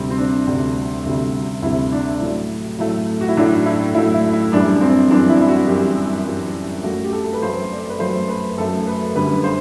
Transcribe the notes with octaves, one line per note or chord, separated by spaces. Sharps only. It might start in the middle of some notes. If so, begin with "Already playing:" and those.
Already playing: D2 C3 G3 C4
C4
D4
D2 C3 G3 D4
D2 C3 G3
D2 C3 G3 E4
D4
A2 F#3 A3
A2 F#3 A3
F#4
E4
A2 F#3 A3 D4
E4
A2 F#3 A3 E4
E4
E4
F#2 E3 G3 D4
C4
F#2 E3 G3 D4
E4
E4
F#4
F#2 E3 G3 G4
F#2 E3 G3
F#2 F#3 A3 F#4
G4
A4
A4
B4
F#2 F#3 A3 C5
D5
B4
F#2 F#3 A3 C5
B4
F#2 F#3 A3 A4
B4
F#2 D3 G3 B4
C5